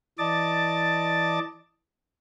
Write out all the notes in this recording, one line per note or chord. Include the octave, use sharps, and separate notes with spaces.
E3 D5 D#5 A5 D6 A6